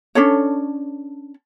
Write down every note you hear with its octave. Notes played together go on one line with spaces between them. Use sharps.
C#4 D4 A4 C#5